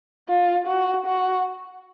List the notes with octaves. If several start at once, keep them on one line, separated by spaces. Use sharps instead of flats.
F4
F#4
F#4